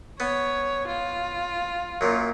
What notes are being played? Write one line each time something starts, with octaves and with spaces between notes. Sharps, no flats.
B3 C#5
F4
F#2 A#2